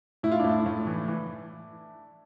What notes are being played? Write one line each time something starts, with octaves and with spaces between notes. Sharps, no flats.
A2 E4
F4
A2 D4 E4
A2
E3
E3